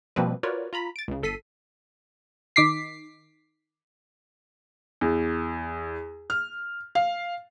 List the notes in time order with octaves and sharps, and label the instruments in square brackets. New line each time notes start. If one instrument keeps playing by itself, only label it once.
[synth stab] B2 F3 G3 A#3 C4 B4
F4 F#4 A#4 B4 C#5 D5
F4 A#5 B5 B6
A6 D7
C#2 C#3
G1 A4 B6 C7 D#7
D#3 D6 B6 C7
[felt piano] E2
F6
F5